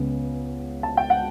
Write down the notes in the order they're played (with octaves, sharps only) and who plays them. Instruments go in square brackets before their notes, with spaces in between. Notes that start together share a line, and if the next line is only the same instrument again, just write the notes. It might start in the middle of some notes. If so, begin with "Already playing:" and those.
Already playing: [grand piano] C#2 C#3 B3
[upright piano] A5
G5
F#5